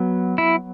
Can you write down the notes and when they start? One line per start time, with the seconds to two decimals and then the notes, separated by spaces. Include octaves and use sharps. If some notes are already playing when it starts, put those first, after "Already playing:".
Already playing: F#3 B3
0.38 E4